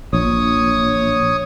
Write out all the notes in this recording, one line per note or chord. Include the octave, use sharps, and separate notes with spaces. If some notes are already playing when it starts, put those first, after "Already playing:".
A#1 C#5 D#6